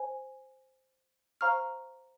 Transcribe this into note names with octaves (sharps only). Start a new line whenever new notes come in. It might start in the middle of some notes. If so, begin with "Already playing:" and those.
Already playing: C5 G#5
C5 F5 A#5 C#6 F6